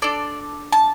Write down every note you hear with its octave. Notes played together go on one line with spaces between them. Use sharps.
D4 A4 D5
A5